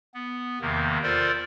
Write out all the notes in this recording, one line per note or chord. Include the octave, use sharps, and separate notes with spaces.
B3
E2 C3 D#3 A#3
F4 A4 A#4 C5 D5